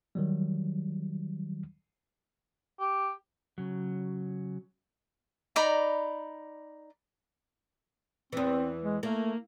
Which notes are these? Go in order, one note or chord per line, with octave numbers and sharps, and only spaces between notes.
D#3 F#3 G3
G4
C#3 F#3
D#4 D5 A#5 B5
E2 E3 C4
G#3
A3 A#3